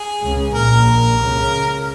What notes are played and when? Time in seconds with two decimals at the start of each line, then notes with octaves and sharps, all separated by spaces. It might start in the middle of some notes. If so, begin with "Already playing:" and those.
Already playing: G#4
0.20 C#2 C#3
0.53 A#1 A#2 A#4
1.19 C#2 C#3